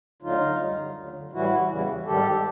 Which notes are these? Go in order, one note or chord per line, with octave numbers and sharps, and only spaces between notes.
D2 D3 F#3 D#4 F4
F#2 D3 G3
D2 D3 F#3
A2 E3 G3 E4 F#4
E2 C#3 E3 G3
G#2 D#3 G3 G4 A4